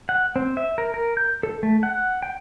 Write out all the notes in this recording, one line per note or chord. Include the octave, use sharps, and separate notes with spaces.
F#5
C4
E5
A#4
A#4
G6
A4
A3
F#5
G5